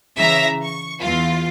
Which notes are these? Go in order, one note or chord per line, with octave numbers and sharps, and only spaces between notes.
C#3 E3 E5 A#5 A#6
C#6
E2 F4